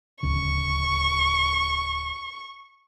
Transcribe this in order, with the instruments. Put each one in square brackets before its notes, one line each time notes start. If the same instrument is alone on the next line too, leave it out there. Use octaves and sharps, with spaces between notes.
[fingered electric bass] D1 C#2 C#3 [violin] C#6